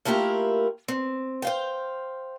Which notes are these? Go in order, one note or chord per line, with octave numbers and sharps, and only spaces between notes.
A3 A#3 E4 F4 G4 A#4
C4
C5 F5 G5